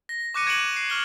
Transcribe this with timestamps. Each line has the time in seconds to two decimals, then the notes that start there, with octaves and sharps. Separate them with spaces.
0.09 A#6
0.34 C#6 D6 F#6 A#6 C#7 D#7
0.47 G#6 C#7 D7 E7 F#7
0.76 C7
0.90 C#6 F6 G7